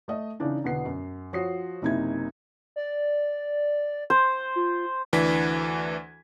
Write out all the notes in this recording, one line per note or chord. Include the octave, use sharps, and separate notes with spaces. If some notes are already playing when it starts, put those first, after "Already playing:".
A3 D#5
C#3 E3 D4 D#4
E2 B2 D3 B3 F#5 C7
F#2
F3 F#4 C#5 D#6 C7
F#1 C3 D#4 E4 G#6
D5
C5
F4
D2 E3 D4 G#6 B6